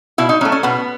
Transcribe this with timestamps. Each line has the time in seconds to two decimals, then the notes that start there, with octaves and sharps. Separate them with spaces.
0.18 B2 E4
0.29 D#4
0.41 F#3 C#4
0.45 A3
0.52 C#4
0.63 B2 B3